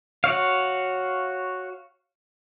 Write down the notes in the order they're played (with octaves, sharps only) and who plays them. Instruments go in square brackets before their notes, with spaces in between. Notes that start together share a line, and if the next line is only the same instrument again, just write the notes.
[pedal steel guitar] F#4 C#5 F5